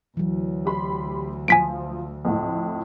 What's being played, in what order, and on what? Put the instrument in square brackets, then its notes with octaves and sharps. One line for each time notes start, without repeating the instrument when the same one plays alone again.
[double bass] D2 [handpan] E3 F#3
[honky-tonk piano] G4 B5 C6
[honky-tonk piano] F3 [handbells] G#5 B6 D7
[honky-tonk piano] F2 A2